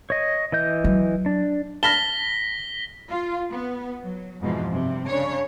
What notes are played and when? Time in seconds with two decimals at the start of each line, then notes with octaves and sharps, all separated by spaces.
0.10 C#5 D#5
0.52 E3 D#5 G6
0.84 F#3
1.26 D4
1.83 A5 B5 F6 A#6 B6 G7
3.09 F4
3.51 B3
4.00 F#3
4.41 F2 G#2 B2 E3 F3
4.71 G2 C3
5.07 C#3 D4 C#5